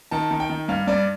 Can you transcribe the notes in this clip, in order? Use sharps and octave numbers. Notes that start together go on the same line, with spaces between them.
D#3 A5
D#3
G5
D#3
G2 F5
G2 D5